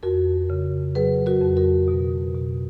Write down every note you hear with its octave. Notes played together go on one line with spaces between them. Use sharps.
F2 F#4 A#4
C#3
F#3 G#4 B4
F#4 A#4
F2
F#4 A#4
B2
B2